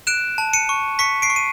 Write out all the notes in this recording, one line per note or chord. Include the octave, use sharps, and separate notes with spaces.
F#6 D7 E7
A5
C#7 D#7
C#6
C#6 B6 C#7
C7 D7
C#6
D#7